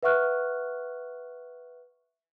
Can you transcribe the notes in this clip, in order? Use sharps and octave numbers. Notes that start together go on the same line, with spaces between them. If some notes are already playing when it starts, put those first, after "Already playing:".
B4 E5 F#5 C#6 F6 F#6